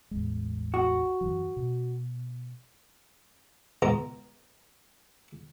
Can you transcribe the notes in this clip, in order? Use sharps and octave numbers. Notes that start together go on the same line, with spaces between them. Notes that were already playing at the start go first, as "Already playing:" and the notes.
A1 E2 G#3
F#4
F#2 E3 F#3
B2
C#2 B2 G#3 A#5